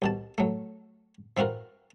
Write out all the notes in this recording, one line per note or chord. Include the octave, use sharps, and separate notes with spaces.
C2 B2 A5
F#3 A3
E3 C4 F4 F#4 A#4